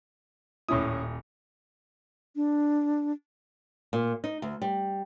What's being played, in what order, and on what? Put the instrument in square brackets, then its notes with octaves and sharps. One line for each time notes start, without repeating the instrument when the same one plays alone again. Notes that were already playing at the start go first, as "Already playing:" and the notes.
[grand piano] D#1 D#6 [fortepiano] A2 C#4 E4
[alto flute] D4
[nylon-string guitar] A#2
D#4
D2
G3